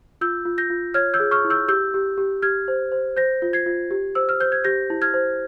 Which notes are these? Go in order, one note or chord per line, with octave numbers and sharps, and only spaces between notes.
F4 E6 G6
F4
G6 A#6
F4
C#5 F6 G#6
E6 G6
G#4
C#6 F6
E4
E6 G6
G4 E6 G6
G4
G4
G4 F6 G#6
C5
C5
C5 G6 A#6
F4
G#6 C7
F4
G4
C5 E6
F6
C5 G6
G#6
G4 G6 A#6
E4
F6 G#6
C5